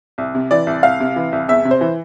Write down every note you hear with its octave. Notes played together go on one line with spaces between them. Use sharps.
C2
C3
E3 D5
C2
C2 F5
C3
E3
C2
E2 E5
C3
C5
E3